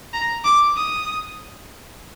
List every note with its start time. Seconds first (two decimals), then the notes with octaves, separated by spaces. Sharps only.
0.13 A#5
0.45 D6
0.77 D#6